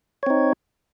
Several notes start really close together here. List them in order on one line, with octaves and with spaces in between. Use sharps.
C#5 C4 D#4